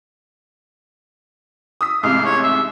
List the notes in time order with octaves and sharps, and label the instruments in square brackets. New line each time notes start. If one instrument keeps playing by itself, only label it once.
[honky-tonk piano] D#6 E6 B6
[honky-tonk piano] A1 G#2 C3 [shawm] F5
[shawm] C#5
E5